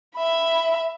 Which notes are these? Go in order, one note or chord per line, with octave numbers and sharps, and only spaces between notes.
E5 B5